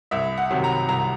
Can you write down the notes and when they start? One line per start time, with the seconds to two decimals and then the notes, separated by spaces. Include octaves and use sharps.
0.11 C2 E5
0.37 F#5
0.50 C3 D#3 F#3
0.64 A#5
0.89 C2 A#5